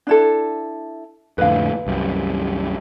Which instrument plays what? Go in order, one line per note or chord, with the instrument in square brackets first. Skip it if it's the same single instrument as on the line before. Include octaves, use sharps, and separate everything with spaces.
[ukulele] D4 E4 A4
[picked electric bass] F2 A2 D3 [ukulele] B4 F5
[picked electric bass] C2 F#2